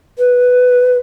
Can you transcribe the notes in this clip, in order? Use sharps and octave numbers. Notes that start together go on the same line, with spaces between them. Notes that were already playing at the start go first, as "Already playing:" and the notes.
B4